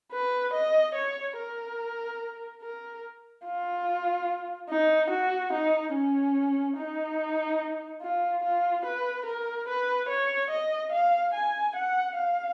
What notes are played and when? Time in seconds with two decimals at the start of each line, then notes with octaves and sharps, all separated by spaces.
0.12 B4
0.53 D#5
0.95 C#5
1.37 A#4
2.62 A#4
3.44 F4
4.69 D#4
5.10 F#4
5.53 D#4
5.94 C#4
6.77 D#4
8.02 F4
8.43 F4
8.85 B4
9.26 A#4
9.68 B4
10.09 C#5
10.50 D#5
10.92 F5
11.34 G#5
11.76 F#5
12.17 F5